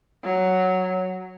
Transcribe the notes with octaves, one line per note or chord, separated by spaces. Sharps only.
F#3